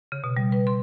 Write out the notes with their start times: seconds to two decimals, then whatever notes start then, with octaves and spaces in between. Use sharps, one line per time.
0.12 C#3
0.24 B2
0.37 G3
0.52 B4
0.67 C6